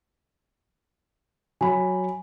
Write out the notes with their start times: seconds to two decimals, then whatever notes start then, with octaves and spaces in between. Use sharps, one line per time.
1.61 F#3 G#5 B5